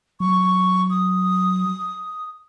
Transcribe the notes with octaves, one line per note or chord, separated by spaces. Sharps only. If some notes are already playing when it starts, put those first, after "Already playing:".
F#3 C#6
D#6